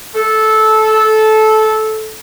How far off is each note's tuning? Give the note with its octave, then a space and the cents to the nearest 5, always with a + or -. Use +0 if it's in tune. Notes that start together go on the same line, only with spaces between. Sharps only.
A4 -15